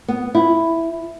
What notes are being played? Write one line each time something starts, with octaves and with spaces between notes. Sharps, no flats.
B3
E4